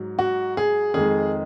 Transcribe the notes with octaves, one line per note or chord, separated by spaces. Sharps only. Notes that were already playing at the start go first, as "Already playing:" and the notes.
Already playing: G#2 F#3
F#4
G#4
F2 D#3 G#3 G#4